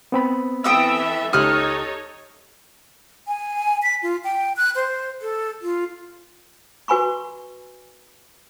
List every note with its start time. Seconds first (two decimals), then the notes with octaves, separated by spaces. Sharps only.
0.12 B3 C4 B5
0.64 E3 A4 E5 G5 D#6 E6
1.33 C#2 D#4 G4 A4 C#5 D#6 F6 F#6
3.28 G#5
3.83 B6
4.03 F4
4.24 G5
4.57 F#6
4.75 C5
5.22 A4
5.62 F4
6.88 F#4 B4 G#5 B5 C#6